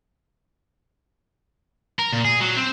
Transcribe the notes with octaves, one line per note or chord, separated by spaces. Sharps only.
A#4
A#2
G#4
F#3
C4